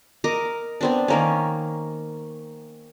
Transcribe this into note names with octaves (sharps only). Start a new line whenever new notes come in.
A#4 D#5 A#5 D6
B3 C4 D4
D#3 A#3 C#4